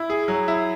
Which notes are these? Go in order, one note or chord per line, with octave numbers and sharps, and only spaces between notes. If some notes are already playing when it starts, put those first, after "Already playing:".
Already playing: E4
G#4
F#3
E4